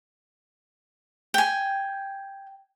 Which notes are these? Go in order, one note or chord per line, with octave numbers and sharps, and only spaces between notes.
G5 G#5